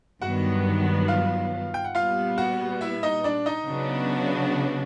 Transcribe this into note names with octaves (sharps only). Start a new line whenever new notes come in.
G2 D#3 F#3 B3 F#4 F#5
F4 F5
G5
F#5
A#2 G3 B3 F4 F5
F#4 F#5
E4 E5
D#4 D#5
D4 D5
D#4 D#5
C#3 F#3 B3 D4 F#4